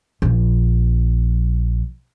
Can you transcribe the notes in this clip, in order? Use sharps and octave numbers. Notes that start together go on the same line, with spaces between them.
A#1 F3